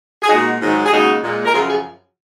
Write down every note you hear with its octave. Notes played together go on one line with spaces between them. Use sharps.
G#4
A#2 G#3 D#4 F#4
G#2 D#3 F#3
G#4
D#2 C#3 G#3 D#4 F#4
A#2 G#3
A#4
F#2 C#3 F3 F4 G#4
F4 G#4